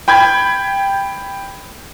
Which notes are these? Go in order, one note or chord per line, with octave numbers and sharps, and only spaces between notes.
G5 B5 G6 G#6